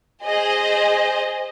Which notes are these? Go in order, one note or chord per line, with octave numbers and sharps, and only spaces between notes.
G#4 C5 D#5